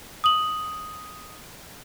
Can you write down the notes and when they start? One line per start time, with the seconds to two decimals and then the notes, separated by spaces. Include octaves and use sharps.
0.24 D#6 F#7